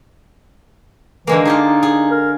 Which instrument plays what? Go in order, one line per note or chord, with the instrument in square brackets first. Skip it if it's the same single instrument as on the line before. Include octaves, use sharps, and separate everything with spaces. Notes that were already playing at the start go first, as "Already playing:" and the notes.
[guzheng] D3 G#3 A#3 [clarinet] E3
[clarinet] D#4 [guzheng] F4 G4 G#4
[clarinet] D#4
[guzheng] G#4
[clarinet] A#4